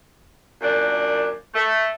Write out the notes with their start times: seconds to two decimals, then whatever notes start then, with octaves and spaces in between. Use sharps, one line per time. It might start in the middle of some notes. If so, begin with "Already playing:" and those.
0.62 F#2 A#2 D4
1.54 A3